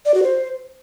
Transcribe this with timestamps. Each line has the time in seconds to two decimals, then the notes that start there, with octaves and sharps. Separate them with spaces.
0.05 D5
0.14 F#4
0.23 C5